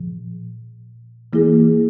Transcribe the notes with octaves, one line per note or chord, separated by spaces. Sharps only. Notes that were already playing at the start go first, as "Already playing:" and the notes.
Already playing: A#2 F3
E3 A#3 E4 G#4